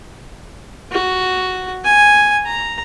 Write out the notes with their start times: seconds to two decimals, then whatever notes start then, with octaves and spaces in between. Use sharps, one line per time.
0.91 F#4
1.84 G#5
2.45 A#5